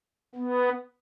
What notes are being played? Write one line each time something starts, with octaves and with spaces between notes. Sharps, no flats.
B3